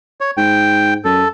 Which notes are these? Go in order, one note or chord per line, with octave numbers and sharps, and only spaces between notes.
C#5
G#2 G5
F#2 A4